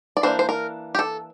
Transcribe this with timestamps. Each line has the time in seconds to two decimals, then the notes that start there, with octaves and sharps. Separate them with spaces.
0.17 D5
0.23 E3 A#3 D4 C5
0.39 C5
0.49 A#4
0.95 G4
0.99 A4